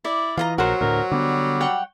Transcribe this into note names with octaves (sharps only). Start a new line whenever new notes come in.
E4 D5
E3 F4 D#5 A#5
A#1 F#3 F#4 A#4 C5
D2 A2 A#4
D3 G3 B3
C#5 F#5 G5